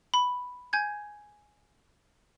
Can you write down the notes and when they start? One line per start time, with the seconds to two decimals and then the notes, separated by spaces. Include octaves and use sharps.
0.14 B5
0.73 G#5 G6 G#6